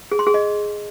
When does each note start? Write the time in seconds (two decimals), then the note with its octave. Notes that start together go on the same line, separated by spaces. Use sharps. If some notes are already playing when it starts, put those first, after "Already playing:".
0.11 G#4
0.19 C6
0.27 G#4
0.34 D#5